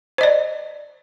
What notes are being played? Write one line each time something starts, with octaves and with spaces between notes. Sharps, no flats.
C5 D5 D#5